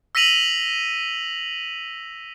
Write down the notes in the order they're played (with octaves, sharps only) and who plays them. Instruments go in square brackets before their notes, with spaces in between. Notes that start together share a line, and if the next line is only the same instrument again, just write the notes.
[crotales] E6 A#6 B6 D#7 F7 F#7